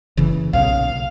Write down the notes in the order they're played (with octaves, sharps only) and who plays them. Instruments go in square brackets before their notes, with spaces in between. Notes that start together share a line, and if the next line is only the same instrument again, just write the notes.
[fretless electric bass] F#1 C#3 E3
[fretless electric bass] B1 A#2 C#3 [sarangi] F5